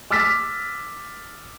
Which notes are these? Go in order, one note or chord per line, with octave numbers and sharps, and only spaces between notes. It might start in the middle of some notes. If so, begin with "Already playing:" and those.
D6 E6 F6 A6 B6